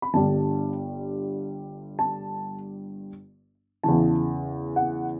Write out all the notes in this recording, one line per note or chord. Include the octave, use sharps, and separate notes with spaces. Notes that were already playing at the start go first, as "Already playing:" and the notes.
B5
G1 G2 D3 G3 A5
A5
E2 C#3 E3 A5
F#5